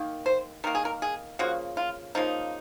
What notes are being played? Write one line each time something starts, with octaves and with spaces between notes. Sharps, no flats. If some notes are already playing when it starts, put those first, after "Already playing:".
Already playing: D#3 A#3
C5
D#3 A#3 A#4
G#4
A#4
G#4
C#3 F3 A#3 F#4
F4
C#3 F3 A#3 D#4